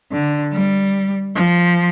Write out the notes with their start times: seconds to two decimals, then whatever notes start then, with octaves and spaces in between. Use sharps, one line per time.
0.12 D3
0.53 G3
1.35 F3